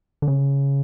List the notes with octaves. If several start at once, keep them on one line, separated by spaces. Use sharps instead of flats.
D3
C#3